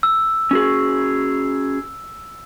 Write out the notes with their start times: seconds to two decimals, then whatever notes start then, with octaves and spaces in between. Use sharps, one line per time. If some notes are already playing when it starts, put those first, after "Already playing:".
0.03 E6
0.51 C#4 F#4 G#4